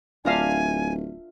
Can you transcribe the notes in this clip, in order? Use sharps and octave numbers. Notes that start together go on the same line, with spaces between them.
D1 D4 F4 A#4 E5 F5 G#5